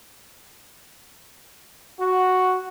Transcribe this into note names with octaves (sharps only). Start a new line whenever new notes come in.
F#4